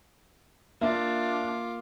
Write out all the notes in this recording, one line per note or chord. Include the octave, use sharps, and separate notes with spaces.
A#3 D4 F4 E5 D6